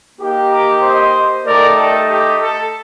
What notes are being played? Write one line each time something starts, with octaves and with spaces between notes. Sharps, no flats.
A#3 D#4 G4
A#5 D6
C5 D#5
A3 D#4 G4 A#4 D5
A4
G4
A4